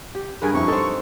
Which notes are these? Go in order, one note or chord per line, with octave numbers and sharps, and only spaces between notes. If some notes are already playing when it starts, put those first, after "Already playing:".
G4
G2 G#4 A#4 B4
F2 E4 C#6
C4 D#4 A4